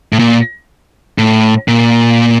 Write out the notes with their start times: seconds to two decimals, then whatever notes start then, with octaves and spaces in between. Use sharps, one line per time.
0.13 A2
0.19 A#2
1.18 A2
1.68 A#2